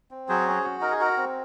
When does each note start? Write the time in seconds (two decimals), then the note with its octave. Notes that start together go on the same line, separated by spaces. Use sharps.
0.11 C4
0.29 F#3 G#4 C5
0.46 C#4
0.64 F#4
0.81 D#4 A#4
0.92 G#4
1.00 F#4 A#4
1.17 C4